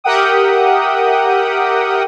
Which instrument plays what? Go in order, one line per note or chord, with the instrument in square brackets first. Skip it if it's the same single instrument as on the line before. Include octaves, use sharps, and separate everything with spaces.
[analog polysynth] G4 A#4 E5 F#5 G5 D#6